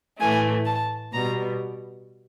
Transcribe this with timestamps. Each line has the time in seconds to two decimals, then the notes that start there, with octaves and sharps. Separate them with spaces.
0.20 A2 E3 A3 G#5
0.65 A5
1.12 B2 G3 B3 A#5